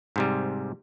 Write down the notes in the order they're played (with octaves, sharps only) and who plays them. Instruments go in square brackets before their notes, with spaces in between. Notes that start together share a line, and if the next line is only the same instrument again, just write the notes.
[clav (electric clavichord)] G#2 C3 G3